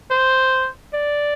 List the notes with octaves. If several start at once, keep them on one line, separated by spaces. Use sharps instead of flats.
C5
D5